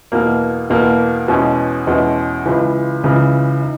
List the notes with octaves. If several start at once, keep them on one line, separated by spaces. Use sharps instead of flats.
E2 B2 A#3
E2 B2 A#3
E2 B2 G#3 C#4
E2 B2 G#3 C#4
C#2 C#3 E3
C#2 C#3 E3
D#4